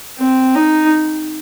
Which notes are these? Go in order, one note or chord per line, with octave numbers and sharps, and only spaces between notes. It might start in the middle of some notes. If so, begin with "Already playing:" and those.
C4
D#4